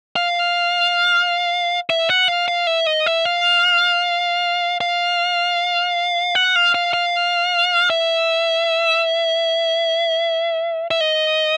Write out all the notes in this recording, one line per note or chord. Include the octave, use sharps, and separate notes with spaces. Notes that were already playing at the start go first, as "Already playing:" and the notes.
F5
E5
F#5
F5
F5
E5
D#5
E5
F5
F5
F#5
F5
F5
F5
E5
E5
D#5